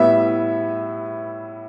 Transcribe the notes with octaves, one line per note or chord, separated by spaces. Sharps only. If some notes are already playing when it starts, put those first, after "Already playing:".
Already playing: A2 G3 B3 E5